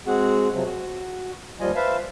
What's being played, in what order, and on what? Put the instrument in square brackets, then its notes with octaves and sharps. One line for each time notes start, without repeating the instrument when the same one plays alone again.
[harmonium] G#3 C4 F#4 G#4 F#5
C3 F3 F#3
F#4
D#2 F3 G3 F4 D#5 G#5
B4 C5 E5 F5 A5